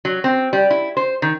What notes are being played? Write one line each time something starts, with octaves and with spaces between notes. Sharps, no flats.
F#3
C4
G3
E4
C5
D#3